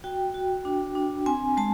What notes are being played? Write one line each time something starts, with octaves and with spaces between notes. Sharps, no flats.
F#4 G5
F#4
D4
D4
C4 G#5
G#3 A5